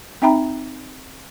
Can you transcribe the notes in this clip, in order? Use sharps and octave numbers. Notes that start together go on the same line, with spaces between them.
C4 D#4 E5 G5 A#5 B5